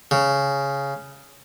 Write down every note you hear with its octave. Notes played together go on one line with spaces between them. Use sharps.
C#3